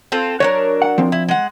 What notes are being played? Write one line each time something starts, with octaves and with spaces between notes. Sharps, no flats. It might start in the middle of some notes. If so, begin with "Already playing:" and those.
C4 F4 A4
F#3 D4 A#4 C#5
F#5
F3 C4
E4
G#3 F#5